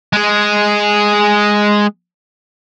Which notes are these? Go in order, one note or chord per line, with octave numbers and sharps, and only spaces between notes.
G#3 G#4